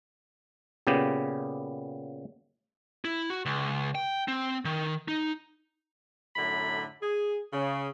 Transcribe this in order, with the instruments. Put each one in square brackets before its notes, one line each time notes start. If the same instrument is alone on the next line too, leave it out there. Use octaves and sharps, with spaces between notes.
[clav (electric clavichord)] A#2 C#3 B3 G4
[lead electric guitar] E4
F#4
C#2
G5
C4
D#3
D#4
[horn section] F#2 A2 D3 B5
G#4
C#3